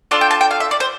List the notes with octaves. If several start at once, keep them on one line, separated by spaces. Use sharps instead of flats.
D4 F4 A4 D5
G5
A5
G5
F5
E5
D5
C5